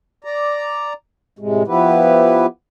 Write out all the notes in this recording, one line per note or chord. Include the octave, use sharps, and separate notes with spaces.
D5 A#5
A2 C3 G#3
F3 B3 E4 G4 B4